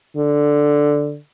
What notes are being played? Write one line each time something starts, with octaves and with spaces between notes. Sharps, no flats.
D3